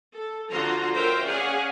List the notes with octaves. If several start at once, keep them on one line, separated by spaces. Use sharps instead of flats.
A4
D3 F3 F4 F#4 A#5 C6
A#4 C5 C#5 E5 F5 G5
C#4 G#4 D5 F5 F#5 G#5